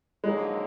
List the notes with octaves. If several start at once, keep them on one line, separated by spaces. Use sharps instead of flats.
F2 D3 F#3 G#3 A#3 D#4